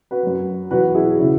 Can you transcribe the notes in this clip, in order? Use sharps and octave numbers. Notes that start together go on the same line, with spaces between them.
F#4 B4
F#2 F#3
E2 B2 F#3 F#4 B4
E4 G#4
C#3 F#3 E4